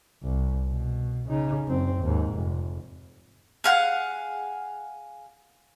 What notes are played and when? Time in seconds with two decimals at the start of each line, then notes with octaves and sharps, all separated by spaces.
0.23 C2
0.69 B2
1.28 C#3 D#4
1.68 F#1 C4
2.03 D#2 G#2
2.35 F1
3.64 G#4 F5 F#5